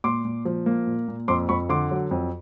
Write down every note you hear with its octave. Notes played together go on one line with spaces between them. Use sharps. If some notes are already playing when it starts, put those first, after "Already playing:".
A#2 C6 D6
A#2
F3
A#3
A#2
A#2
F2 C6 D6
F2 B5 C#6
D3 C6 D6
F#3
F2